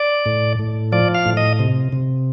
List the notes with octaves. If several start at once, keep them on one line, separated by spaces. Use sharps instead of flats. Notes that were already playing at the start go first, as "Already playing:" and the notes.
Already playing: D5
A2
A2
F3 D5
F5
A2
D#5
C3
C3